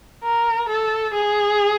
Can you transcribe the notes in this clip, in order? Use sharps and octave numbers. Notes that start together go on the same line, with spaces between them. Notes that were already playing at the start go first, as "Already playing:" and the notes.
A#4
A4
G#4